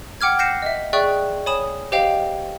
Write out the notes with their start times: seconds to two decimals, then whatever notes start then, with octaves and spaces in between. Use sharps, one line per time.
0.21 F#5 G5 D6 F6 G#6
0.39 F#6 G6 A#6 C7 C#7 E7
0.62 D#5 E5
0.93 G#4 D5 E5 G5 C#6 F#6
1.46 C#5 G#5 B5 D#6 E7
1.92 G4 C5 D#5 F5 G5 F7